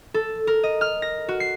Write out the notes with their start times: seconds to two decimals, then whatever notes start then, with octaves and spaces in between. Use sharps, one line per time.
0.14 A4
0.47 A#4
0.63 D#5
0.81 F6
1.02 A#6
1.28 F#4
1.40 C7